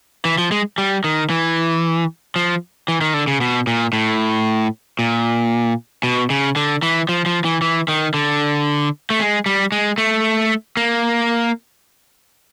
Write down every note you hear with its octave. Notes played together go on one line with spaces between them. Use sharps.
E3
F3
G#3
G3
D#3
E3
F3
E3
D#3
D3
C#3
B2
A#2
A2
A#2
B2
C#3
D3
E3
F3
F3
E3
E3
D#3
D3
A3
G#3
G3
G#3
A3
A#3